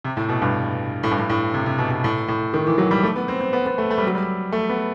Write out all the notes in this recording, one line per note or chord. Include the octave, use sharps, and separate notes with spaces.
C3
A2
B2
G2
A2
G2
A2
A2
C3
C3
B2
B2
A2
A2
D#3
E3
F#3
G3
A3
B3
C4
C4
B3
B3
A3
A3
G3
F#3
G3
A3
B3